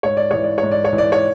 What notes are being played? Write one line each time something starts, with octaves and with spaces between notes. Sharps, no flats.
G#2 C#5
D5
E3 C#5
D5
G#2 C#5
D5
C#5
E3
D5
C#5